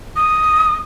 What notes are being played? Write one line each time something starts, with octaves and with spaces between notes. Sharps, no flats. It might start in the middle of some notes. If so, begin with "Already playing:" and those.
D#6